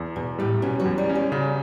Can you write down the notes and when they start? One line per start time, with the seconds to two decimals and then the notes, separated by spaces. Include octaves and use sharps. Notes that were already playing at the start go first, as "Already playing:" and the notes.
Already playing: E2
0.16 E2 B2
0.39 A2 G3
0.62 B2 C#4
0.80 F#3
0.85 E2
0.98 G3
1.09 C#4
1.15 G3
1.32 C#3 F#4